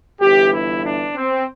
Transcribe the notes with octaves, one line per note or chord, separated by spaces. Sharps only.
G1 G2 E3 G4
E4
D4
C4